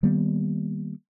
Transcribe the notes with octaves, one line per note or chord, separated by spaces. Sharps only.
D#3 G3 A#3 B3